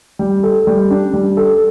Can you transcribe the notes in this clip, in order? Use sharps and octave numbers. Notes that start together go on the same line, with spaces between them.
G3
A4
G3
D4
G3
A4